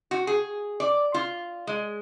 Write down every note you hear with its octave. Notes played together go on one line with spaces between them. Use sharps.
F#4
G#4
D5
F4
G#3